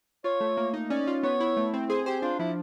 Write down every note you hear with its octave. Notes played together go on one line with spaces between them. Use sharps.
F4 C#5
A3
A#3
D#4
C#4 D5
F4
B3 C#5
E4
A3
C4
G#4 C5
G4 C5
D4 F4
F3 E4